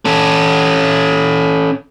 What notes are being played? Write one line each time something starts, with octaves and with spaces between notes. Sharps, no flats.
C#4 A4